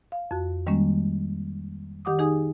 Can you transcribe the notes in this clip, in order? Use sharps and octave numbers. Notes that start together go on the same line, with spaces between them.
F5
F2 F#4
D#3 G3 G#3 A#3 C#4
D#3 G4 F#5 D6 D#6
D#3 D#4 G#4 G#5 D#6